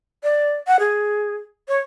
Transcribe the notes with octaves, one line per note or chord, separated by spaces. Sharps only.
D5
F#5
G#4
C#5